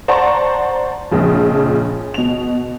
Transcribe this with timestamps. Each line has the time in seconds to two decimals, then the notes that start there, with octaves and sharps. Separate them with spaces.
0.08 C5 D5 F#5 A5 A#5 C#6
1.11 A#1 F2 C#3 F3
2.14 B2 F7